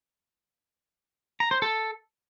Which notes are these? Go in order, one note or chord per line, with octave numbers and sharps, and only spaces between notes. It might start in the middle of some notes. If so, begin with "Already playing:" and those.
A#5
C5
A4